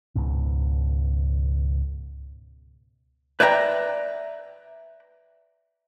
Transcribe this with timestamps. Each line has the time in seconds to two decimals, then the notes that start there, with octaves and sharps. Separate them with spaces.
0.15 C#2 G#2 B2
3.40 B4 D5 E5 G5 G#5 A#5